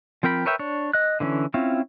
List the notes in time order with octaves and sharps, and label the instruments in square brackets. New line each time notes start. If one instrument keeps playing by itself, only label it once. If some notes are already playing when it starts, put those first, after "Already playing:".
[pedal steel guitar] F3 C4 A#4 G5 B5
A#4 B4 C#5 E5 G5
D4 C#5
D#5 F#6
D3 E3 C4 C#4
C4 C#4 E4 F4